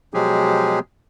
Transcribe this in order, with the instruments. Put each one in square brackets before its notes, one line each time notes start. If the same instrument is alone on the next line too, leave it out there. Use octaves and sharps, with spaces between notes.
[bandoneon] B2 F3 F#3 G#3 G4 G#4